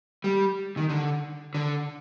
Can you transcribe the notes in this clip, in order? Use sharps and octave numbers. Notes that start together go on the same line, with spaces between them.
G3
D#3
D3
D3